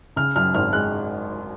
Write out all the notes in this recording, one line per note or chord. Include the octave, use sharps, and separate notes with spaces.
C#3 F6
F#2 F6
G#1 F6
G#3 F#6